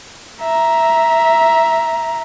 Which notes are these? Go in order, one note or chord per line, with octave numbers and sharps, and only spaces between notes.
E5 A#5